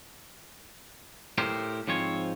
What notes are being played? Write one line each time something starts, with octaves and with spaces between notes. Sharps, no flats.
A2 G4 A#4 C5
G#2 F3 C4 C#5